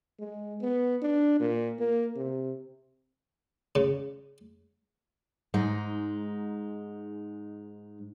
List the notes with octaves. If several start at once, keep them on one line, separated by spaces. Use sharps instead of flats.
G#3
B3
D4
A#2
A#3
C3
C#3
G#2 G#3 D#4